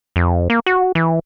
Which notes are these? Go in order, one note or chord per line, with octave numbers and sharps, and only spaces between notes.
F2
A#3
F#4
E3